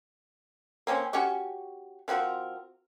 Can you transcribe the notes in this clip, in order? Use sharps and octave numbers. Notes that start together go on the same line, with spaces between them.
A#3 C4 C#4 C5
C#4 F#4 G4 C#6
F3 C4 F#4 A#4